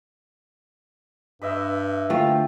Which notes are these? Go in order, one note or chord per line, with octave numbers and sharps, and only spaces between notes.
G2 B4 D#5 E5
D2 A3 F4 G5